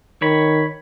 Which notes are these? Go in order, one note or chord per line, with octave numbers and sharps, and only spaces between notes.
D#3 C#5 B5